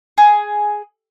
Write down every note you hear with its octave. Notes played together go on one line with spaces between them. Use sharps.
G#4